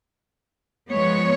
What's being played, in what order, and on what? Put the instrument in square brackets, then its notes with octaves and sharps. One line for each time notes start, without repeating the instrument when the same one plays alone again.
[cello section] F3 G#3 B3 C#5